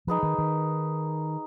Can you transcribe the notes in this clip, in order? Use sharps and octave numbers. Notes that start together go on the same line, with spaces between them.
F3 D#4 G#4 B4
D#3
D#3